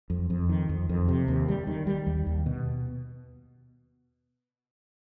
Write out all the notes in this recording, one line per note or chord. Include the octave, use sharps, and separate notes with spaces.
F2
F2
D#3
F2
F2
C3
D#2
G3
D#3
G3
D#2
D#2
B2